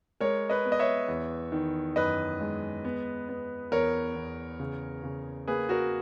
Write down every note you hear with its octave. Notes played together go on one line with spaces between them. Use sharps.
G#3 A#4 C#5
B4 D#5
B3
D#5
C#5 E5
E2
D#3
F#2 B4 D#5
G#3
B3
B3
E2 A#4 C#5
E2
C#3
C#3
A#3 G#4 B4
F#4 A#4